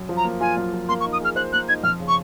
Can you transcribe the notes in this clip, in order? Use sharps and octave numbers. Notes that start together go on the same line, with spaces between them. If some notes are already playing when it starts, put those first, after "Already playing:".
Already playing: F#2
F3
A#5
A#3
F4 G#5
F#2
F3
A#3 C6
C#6
D#4
D#6
G#4 F6
C5 F#6
A#3 F#6
D#4 G#6
F2 F6
C#3
C#6